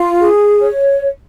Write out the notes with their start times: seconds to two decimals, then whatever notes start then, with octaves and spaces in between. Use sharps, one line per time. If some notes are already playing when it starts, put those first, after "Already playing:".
Already playing: F4
0.21 G#4
0.61 C#5